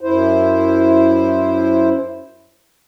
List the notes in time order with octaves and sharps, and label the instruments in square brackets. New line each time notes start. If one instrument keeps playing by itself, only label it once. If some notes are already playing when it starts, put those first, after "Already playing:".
[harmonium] F#2 E4 C5